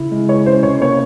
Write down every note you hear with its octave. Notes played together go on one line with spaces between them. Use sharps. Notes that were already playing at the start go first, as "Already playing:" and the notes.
Already playing: C#3 E4
G#3
G#3 C#5
C#4 C5
C3 C#5
A#3 C#5